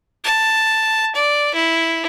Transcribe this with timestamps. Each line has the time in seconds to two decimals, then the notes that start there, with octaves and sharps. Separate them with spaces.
0.25 A5
1.15 D5
1.54 E4